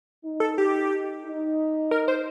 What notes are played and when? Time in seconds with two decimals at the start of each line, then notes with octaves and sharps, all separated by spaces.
0.24 D#4
0.40 A4
0.58 G4
1.25 D#4
1.91 A#4
2.08 C5